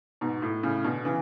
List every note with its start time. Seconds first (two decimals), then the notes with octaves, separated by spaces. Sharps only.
0.21 G#2 B2
0.42 A2
0.63 A2 C#3
0.84 B2 D3
1.05 C#3 E3